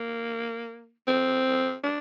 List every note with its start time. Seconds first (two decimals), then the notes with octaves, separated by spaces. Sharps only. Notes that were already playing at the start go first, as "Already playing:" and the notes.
Already playing: A#3
1.07 C4
1.83 D4